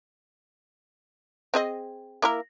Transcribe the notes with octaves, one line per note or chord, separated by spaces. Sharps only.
C4 G#4 D#5
A#3 E4 A#4